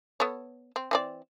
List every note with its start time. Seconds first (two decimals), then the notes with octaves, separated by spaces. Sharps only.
0.20 B3 A4 C#5
0.76 C4
0.91 E3 C4 D5